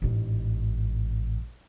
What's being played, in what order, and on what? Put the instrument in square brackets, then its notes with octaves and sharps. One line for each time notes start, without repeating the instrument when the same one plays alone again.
[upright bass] A1 G#2